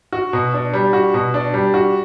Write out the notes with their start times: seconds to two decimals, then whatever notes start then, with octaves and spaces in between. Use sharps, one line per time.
0.12 F#4
0.33 B2
0.54 D4
0.74 G3
0.93 F#4
1.14 B2
1.34 D4
1.54 G3
1.74 F#4